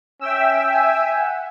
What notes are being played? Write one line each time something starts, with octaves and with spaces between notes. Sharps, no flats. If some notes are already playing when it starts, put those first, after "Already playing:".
C#4 E5 G5 E6
G#5
F#5